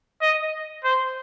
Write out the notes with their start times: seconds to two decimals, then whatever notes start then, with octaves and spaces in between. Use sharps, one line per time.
0.22 D#5
0.85 C5